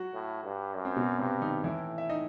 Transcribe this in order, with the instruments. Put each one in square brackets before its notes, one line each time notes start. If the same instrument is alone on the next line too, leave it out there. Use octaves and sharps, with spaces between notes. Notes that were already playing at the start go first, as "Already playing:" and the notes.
Already playing: [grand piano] F#3 F#4
[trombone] A2
G2
F#2
[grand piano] C4
B2 B3
[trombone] G2 [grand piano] C3 C4
[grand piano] D#3 D#4
[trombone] A2 [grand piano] E3 E4
[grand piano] E5
D#4 D#5